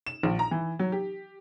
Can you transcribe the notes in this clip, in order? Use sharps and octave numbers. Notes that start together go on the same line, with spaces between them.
E7
A#1
A#5
E3
F#3
G4